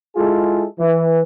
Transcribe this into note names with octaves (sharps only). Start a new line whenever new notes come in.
G#3 E4 F4 G#4 A4
E3